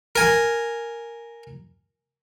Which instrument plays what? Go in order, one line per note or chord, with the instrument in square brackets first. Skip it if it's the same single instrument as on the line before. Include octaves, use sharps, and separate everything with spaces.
[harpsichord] A#4 G#5